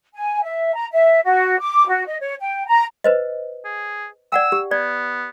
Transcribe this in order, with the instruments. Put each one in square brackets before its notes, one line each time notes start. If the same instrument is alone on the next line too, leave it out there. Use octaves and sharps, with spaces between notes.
[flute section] G#5
E5
A#5
E5
F#4
D6
F#4
D#5
C#5
G5
A#5
[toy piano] B4 C5 D#5
[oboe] G#4
[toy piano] D5 F#5 G5 [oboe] E6
[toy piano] G4
[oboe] B3 [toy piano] D5